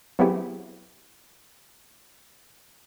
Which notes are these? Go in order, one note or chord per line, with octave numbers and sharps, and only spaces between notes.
F#3 B3 C4 E4 G4 G#4